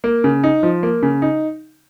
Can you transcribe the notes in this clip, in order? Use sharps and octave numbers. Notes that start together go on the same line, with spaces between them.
A#3
C#3
D#4
F3
A#3
C#3
D#4